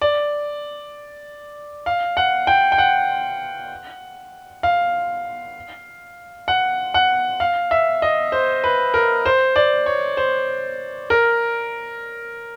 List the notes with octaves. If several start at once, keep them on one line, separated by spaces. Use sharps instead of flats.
D5
F5
F#5
G5
G5
F#5
F5
F#5
F#5
F5
E5
D#5
C5
B4
A#4
C5
D5
C#5
C5
A#4